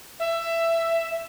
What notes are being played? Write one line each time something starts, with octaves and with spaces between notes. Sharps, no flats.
E5